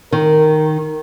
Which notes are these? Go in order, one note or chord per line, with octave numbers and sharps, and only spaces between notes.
D#3 A#4